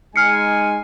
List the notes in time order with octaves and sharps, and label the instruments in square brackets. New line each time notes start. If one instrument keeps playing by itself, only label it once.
[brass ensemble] G#3 D#4 G#5 [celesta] F6 C7 C#7